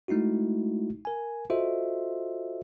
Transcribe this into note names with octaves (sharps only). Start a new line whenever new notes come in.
G#3 A3 D#4 E4 F#4
A#4 G#5
F4 F#4 A4 C5 D#5 E5